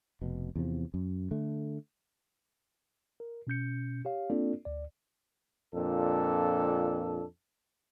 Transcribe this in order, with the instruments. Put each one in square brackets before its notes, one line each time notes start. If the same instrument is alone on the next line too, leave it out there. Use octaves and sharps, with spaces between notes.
[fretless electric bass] F1 B2
E2 C3 F3
F#2
D3 A3
[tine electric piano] A#4
B2 C#4 G6 C#7
G4 C#5 F5
A#3 C4 D4 F4 A4 D5
D2 D5
[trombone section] F2 A#2 D4 A4